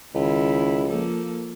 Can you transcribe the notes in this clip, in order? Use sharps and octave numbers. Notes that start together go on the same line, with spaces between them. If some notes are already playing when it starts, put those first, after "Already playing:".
C#2 D#3 C#4 E4
F3 A#3 A4